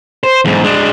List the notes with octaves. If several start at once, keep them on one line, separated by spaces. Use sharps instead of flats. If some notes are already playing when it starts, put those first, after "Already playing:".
C5
E2 G#2
G#3 D4